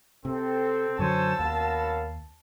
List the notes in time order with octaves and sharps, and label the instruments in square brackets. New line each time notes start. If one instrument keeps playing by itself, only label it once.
[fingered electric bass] C3 [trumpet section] C4 [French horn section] A4
[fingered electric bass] F#2 D3 F#3 [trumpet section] C5 C#5 G#5 [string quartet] A5 E6
[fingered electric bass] D#2 [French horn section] B3 C#4 A#4 [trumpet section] F#4 F5 B5